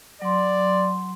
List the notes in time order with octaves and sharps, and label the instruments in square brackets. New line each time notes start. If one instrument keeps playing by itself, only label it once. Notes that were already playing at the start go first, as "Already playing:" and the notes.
[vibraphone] F#3 C6 [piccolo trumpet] D5